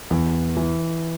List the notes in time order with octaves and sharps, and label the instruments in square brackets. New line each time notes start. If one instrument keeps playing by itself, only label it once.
[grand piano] E2 [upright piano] E3
[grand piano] E3